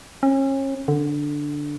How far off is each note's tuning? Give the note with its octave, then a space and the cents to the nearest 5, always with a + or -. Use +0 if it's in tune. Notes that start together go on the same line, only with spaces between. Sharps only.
C#4 -35
D3 +0